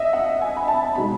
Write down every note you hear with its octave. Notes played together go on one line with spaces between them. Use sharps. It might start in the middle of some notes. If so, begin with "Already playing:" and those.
Already playing: D#5 E5
F#5
G#5
B5
A5
B2 G#3 D#4 B5